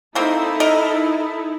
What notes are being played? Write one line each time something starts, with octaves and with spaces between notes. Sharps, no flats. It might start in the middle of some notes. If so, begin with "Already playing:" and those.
A#3 C4 D#4 E4 A4
A#4 D#5